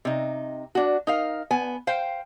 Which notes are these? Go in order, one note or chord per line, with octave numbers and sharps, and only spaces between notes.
C3 D#4
D4 F#4
D#4 A#4 F5
B3 G#5
C5 F5 G5